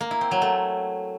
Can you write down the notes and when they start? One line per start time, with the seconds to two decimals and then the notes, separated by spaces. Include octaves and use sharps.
0.01 A#3
0.11 E4
0.21 C4
0.31 F#3
0.42 A3